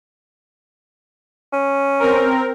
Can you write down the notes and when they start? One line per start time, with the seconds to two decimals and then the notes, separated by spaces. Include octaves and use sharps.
1.53 C#4
2.00 C4 A#4